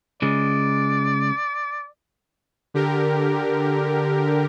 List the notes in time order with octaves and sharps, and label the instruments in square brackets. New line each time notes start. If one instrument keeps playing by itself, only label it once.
[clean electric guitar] C#3 G#3 [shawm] D5
[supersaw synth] D3 G4 A#4